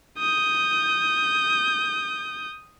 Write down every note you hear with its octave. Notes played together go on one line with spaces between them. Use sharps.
D#6 G6